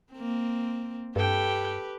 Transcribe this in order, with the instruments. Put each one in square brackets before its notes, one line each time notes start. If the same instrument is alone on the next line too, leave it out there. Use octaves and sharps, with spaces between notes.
[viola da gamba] A#3 C4
[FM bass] G2 [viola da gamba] G4 B4 [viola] A4 G5